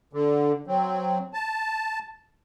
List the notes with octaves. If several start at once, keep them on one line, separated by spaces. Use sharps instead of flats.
D3
F#3 C4
A5